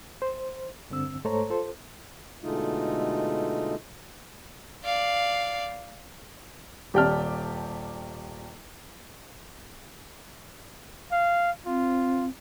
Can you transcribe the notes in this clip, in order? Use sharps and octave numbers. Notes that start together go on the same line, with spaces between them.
C5
G2 D3 C4 E6
G#2 A3 A4 C5 C#5 A#5
F4 A4 C5
B2 D3 G#3 A3 D#4 F4
D5 F5
D#1 G4 D5 G5 A5 F6
F5
C4 F4